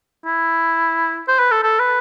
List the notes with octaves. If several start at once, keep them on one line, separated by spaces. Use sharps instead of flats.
E4
C5
B4
A4
A4
B4